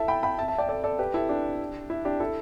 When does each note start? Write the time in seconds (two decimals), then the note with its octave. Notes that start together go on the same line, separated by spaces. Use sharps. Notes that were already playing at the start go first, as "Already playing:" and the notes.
Already playing: E4 A4 E5 A5
0.08 G5 B5
0.23 G5 B5
0.38 E5 A5
0.48 E5 A5
0.58 D5 G5
0.69 A4 D5
0.84 A4 D5
0.99 G4 B4
1.14 E4 A4
1.29 D4 G4
1.90 E4
2.05 D4 G4
2.20 E4 A4